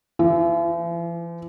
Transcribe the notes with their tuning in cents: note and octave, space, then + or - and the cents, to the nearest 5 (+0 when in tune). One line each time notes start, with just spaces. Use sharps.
E3 +45